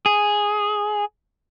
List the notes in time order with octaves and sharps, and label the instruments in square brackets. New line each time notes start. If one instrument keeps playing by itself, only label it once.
[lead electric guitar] G#4